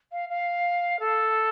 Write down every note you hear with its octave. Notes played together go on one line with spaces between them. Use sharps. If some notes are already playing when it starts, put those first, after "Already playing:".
F5
F5
A4